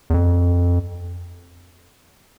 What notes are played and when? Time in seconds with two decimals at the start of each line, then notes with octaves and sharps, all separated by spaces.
0.10 E2
0.14 F2